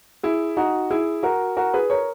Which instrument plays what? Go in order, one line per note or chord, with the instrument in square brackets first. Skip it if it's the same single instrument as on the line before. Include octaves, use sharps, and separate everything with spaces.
[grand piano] E4 G#4
D#4 F#4
E4 G#4
F#4 A#4
F#4 A#4
G#4 B4
A#4 C#5